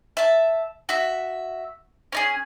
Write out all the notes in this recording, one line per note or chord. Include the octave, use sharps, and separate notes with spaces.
E5 A5
F#4 E5
C#4 D#4 G#4